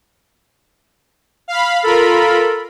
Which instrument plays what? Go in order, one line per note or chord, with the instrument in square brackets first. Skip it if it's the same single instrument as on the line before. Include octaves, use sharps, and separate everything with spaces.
[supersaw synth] F5 B5
[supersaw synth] F4 A#4 B5 [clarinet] A4